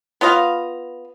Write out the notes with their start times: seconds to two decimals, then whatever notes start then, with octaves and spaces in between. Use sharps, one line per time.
0.21 B3 F4 D#5 F5